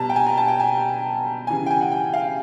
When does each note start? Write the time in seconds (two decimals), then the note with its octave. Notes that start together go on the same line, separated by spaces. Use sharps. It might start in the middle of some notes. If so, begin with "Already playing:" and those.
Already playing: B2 G3 A5 A#5
0.10 G5
0.16 G#5
0.26 A#5
0.37 A5
0.48 G5
0.60 G#5
1.47 C#3 E3 G3 G#5
1.66 G5
1.71 G#5
1.81 F#5
1.92 G5
2.13 F5